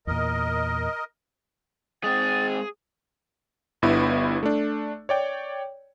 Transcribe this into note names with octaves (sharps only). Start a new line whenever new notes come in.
E2 A#2 A#4 D#5
G#3 C4 G#4 A6
G1 G2 B3 E4
A3 D4
C#5 D5 G5